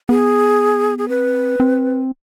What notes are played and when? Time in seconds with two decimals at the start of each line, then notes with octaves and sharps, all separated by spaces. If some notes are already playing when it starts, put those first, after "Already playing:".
0.09 B3 G#4
0.98 G#4
1.09 C4 B4
1.60 C4